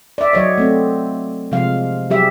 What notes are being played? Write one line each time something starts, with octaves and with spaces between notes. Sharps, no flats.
D5 E5
F#3 C#5 D#5
A3 C4
C3 F3 G#3 F5
F#3 G3 G4 G#4 E5